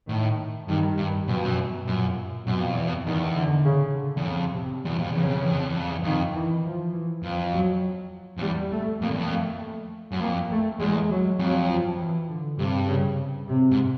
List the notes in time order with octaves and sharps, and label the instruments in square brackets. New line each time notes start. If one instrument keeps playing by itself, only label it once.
[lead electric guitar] A2 [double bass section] D#3
[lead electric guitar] G2 [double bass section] D#3
[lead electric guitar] G2
[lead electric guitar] F#2 [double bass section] B2
[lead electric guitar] F2
F#2
[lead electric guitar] F#2 [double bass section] A#2
[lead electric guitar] F#2 [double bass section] B2
[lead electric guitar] F2
E2
F2
[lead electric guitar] E2 [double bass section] D#3
[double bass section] D3
C#3
D3
[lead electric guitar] E2
[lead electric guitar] F2 [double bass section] C#3
[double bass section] C3
[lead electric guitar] E2 [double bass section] B2
[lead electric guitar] F2
[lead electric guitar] E2 [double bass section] C#3
[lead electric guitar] F2
E2
F2
E2
F2
E2
[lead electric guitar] F2 [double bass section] D#3
[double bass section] E3
F3
E3
[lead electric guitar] F2 [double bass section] F3
[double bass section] F#3
[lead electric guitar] F2
[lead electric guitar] E2 [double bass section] G3
[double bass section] A3
[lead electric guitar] F2 [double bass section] A#3
[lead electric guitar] E2
F2
[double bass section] A3
[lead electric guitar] F#2
[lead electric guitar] F2 [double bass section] A#3
[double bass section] A3
[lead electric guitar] E2 [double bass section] G#3
[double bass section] F#3
[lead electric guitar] F2 [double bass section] F#3
[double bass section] F3
E3
D3
[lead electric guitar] G2 [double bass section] C3
[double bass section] C#3
C3
[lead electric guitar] G#2